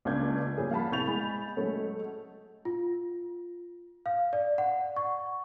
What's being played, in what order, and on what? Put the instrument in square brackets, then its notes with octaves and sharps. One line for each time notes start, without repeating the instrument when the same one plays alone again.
[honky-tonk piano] C#2 A#3 D4 F5 G6 G#6
F3 G3 A#3 C#4 G#4
F5 F#5 A5 B5
C2 C4 C#6 G6 A6 F7
G#3 G#5 B5
F#3 G#3 A3 C#4
[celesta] F4
F5
D5
F#5
C#6